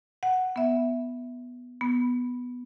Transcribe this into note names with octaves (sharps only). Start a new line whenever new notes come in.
F#5
B3 E5
B3